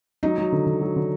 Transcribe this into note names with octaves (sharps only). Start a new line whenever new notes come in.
F#3 D#4
F#3
D3
D3
F#3
D3